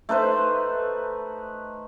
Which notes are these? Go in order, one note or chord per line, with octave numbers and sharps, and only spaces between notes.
A3 D#4 B4 C5